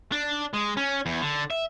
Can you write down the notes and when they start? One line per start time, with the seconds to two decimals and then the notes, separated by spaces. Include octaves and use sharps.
0.12 D4
0.54 G#3
0.77 C#4
1.06 E2
1.22 D3
1.51 E5